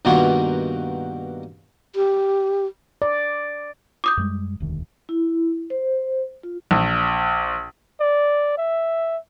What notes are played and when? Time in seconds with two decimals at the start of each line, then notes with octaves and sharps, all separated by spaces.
0.05 G2 B2 D#3 A#3 F4 F#4
1.96 G4
3.02 D5
4.04 D6 D#6 G6
4.17 F#2 G3 G#3
4.60 E1 D2 D#3
5.09 E4
5.70 C5
6.43 F4
6.71 A#1
8.00 D5
8.58 E5